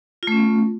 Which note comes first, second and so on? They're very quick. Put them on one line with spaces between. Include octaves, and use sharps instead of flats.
F4 A3 C#4 B3